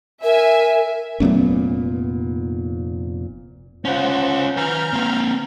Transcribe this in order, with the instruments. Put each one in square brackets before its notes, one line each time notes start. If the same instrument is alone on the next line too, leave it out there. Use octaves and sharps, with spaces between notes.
[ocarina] A#4 [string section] E5 G#5
[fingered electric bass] F1 A#2 B3 [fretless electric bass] F#3 A3 C#4
[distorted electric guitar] C#4 F4 [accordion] C5 F#5
[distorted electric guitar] B4 G#5 [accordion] A#5 F6 G6
[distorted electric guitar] A#3 C4